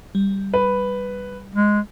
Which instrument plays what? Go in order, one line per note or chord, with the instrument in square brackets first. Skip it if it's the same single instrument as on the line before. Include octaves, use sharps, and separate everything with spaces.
[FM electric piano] G3
[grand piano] B4
[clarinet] G#3